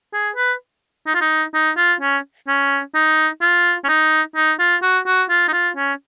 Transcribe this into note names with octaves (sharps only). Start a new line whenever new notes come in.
G#4
B4
D#4
F4
D#4
D#4
F4
C#4
C#4
D#4
F4
C#4
D#4
D#4
F4
F#4
F#4
F4
D#4
F4
C#4